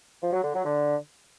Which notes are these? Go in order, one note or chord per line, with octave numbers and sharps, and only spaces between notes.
F3
F#3
D3
F#3
D3